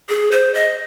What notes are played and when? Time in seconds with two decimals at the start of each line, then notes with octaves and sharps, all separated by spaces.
0.09 G#4
0.31 C5
0.54 D#5